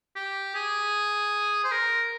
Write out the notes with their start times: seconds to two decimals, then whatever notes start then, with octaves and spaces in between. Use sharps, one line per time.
0.16 G4
0.55 G#4
1.64 C5
1.72 A#4